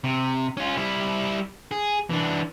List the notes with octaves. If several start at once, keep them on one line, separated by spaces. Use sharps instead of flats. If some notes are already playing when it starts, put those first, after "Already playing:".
C3
C#4 F4
G3 E4
G#4
E3 D4